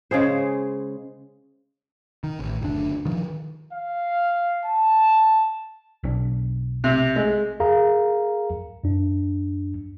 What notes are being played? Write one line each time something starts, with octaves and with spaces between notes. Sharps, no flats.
C#3 G#3 G#4 C5
D#3
A1
F#1 D2 D4
D#3 F3
F5
A5
B1 C#4 D4
C3
G#3
G#4 A#4 F5 A#5
F#2 D4